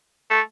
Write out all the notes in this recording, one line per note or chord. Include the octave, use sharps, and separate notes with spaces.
A3